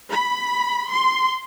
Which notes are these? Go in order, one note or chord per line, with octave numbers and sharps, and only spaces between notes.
B5
C6